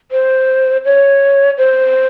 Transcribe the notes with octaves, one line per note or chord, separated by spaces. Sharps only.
C5
C#5
C5